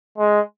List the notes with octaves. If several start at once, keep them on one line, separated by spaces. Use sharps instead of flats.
G#3